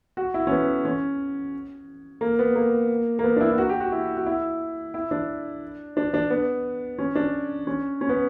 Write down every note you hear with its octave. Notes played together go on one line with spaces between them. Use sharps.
F#4
E4
C#4
B3
C#4
A#3
B3
A#3
A#3
B3
D4
E4
E4
F#4
G4
F#4
E4
F#4
E4
E4
D4
D4
D4
B3
C#4
D4
C#4
C#4
B3